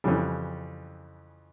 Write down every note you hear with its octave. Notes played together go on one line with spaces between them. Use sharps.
F2 C#3 E3 G3